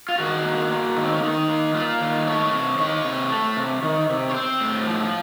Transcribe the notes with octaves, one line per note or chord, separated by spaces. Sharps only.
F4
D#3 F#4
A#3
A#3
D#3
C4
C#4
D#3 D#4
A#3
A#3 F4
D#3
A3 C#5
C3
D#3 C#5
C3
A3
C3
D#3
C3
C#5
C4 C5
A2
F3